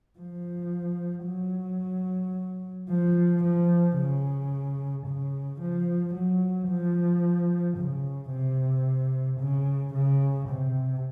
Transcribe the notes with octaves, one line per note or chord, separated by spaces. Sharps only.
F3
F#3
F3
F3
C#3
C#3
F3
F#3
F3
C#3
C3
C#3
C#3
C3